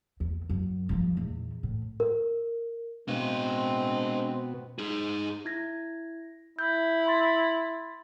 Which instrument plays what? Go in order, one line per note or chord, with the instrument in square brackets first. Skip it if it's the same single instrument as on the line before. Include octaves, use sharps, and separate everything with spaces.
[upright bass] E2
F#2
G2 F3
E2 A#2
A2
[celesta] A#4
[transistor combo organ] B2 B3 [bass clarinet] G#3 [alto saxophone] C4 [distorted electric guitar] D4 F5
[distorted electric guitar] D#4 G#4
[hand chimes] E4 G#6 A#6
[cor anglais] E4 [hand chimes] G6
[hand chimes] B5 C6 A6